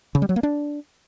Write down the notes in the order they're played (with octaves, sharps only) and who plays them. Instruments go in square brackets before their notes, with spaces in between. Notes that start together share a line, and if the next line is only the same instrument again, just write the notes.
[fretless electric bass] C#3
G3
F#3
A#3
D4